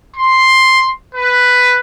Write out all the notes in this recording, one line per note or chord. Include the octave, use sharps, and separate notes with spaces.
C6
B4